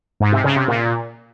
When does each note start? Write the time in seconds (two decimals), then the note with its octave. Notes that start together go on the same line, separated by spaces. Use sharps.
0.20 G#2
0.32 C3
0.44 C#3
0.56 C3
0.68 A#2